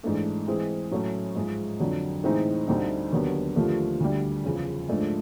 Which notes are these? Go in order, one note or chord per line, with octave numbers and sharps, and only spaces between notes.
G#2 E3 A3 D4
E3 G#3 C4
A2 F#3 A3 C#4
G#2 F3 G#3
F2 D3 F#3
A2 E3 G#3 C4 D#4
D2 D3 G3 C4 D#4
D#2 D3 F#3 B3
D#2 D3 F3 A3
D2 D3 G3
E2 C#3 F3
G#2 F3 A3 D4